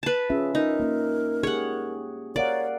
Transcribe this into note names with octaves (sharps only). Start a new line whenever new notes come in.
B4 A5
C#4 F4 G#4 E5
D#4 A#4
A#3 C#4
G4 G#4 C#5 F#5
A#4 C#5 D5 F5 F#5